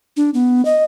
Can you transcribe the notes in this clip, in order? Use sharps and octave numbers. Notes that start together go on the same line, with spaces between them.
D4
B3
D#5